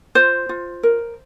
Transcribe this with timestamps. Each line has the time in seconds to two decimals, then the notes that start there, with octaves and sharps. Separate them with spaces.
0.15 F4 C5
0.49 F4
0.83 A#4